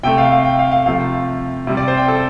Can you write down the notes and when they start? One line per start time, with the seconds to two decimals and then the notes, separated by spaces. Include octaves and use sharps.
0.03 C3 A3 G5
0.18 F5
0.32 F5
0.45 G5
0.59 F5
0.71 F5
0.86 C3 F3 A3 F5
1.67 C3 G3
1.77 D5
1.88 C5
1.97 G5
2.08 A4